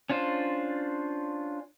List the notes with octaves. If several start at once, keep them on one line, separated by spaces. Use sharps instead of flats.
C#4 D4 F4 C5